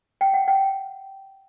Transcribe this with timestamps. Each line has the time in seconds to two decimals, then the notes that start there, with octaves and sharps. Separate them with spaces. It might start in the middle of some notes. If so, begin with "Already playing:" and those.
0.21 G5
0.34 F#5
0.48 G5